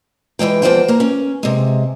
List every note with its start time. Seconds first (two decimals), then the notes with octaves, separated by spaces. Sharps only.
0.39 E3 F#3 G#3 G5
0.62 E2 D#3 F3 C5 F#5 G5
0.88 A#3 A#4
1.00 C#4
1.43 C3 G#3